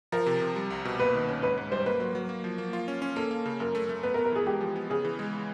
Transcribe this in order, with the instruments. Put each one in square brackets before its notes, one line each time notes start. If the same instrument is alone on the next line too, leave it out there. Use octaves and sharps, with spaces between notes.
[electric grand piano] F3 [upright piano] A#4
[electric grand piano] C3
C3
G3
C2
B2
[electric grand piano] A#3 [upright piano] B4
[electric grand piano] D#3
C#4
[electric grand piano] G#2 [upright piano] B4
[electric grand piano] G#2
[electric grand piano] G3 [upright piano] C5
[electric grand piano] A#3 [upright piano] B4
[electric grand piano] F#3
F#3
A#3
F3
A#3
F4
C#4
C#4
[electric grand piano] A#3 [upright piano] A4
[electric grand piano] A#3
C#3
[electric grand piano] F#2 [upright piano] A#4
[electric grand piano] A3
A3
[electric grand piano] B3 [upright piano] B4
[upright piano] A#4
[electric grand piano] B3
[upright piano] A#4
[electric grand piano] E3 [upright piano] G#4
[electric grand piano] G#3 [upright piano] G4
[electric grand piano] F3
B3
[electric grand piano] C#3 [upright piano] G#4
[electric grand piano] E3
G#3